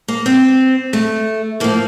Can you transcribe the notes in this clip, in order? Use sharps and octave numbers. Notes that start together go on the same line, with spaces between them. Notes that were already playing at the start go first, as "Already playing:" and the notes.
A#3
C4
A3
A2 F3 A#3